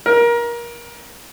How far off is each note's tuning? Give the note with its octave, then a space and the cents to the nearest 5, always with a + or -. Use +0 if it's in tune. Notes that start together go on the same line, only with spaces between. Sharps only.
A#4 +25